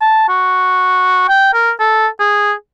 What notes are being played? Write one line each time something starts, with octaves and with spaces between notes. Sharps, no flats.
A5
F#4
G5
A#4
A4
G#4